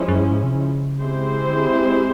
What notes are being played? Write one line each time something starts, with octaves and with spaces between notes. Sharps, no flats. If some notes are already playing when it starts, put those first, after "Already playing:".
Already playing: F3 G#3 C#4 E4
F#2
G2
G#2
C3
C#3
G#3 C4 E4 G4 C5
D3